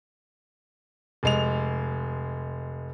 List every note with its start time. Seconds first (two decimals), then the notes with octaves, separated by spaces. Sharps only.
1.23 F1 G#3 F7